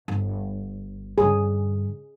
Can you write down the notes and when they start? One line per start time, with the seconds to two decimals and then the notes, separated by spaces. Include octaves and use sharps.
0.08 G1
1.18 G2 D3 G#4